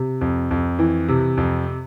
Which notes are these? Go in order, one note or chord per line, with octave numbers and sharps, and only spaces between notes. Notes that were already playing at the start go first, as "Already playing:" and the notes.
Already playing: C3
F2
F2
E3
C3
F2